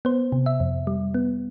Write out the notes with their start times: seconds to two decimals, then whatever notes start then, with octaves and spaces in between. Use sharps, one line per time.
0.05 B3 C5
0.32 C3
0.46 E5
0.60 F2
0.87 G3
1.14 B3